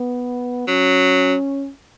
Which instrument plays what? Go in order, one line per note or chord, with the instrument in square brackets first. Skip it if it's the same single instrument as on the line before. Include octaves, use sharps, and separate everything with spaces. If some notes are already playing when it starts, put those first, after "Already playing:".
Already playing: [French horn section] B3
[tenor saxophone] F#3 [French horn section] C#4